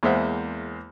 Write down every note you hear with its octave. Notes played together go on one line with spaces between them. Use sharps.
E2 G#3 A#3 C5 E5 F#5